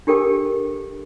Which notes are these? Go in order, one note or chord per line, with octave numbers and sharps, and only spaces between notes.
D4 G4 A4 A#4 G5 D6